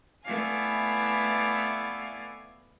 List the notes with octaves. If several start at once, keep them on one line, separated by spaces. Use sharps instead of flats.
A3 B3 E4 D5 F5 G#5